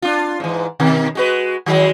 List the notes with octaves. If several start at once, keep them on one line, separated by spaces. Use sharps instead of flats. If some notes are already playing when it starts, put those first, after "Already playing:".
D4 F4
G#2 E3
B2 D#3
G#3 F#4 B4
D#3 F#3 G#3